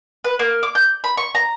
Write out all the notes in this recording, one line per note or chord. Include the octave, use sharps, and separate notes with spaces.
B4
A#3
D6
G6
B5
C#6
A#5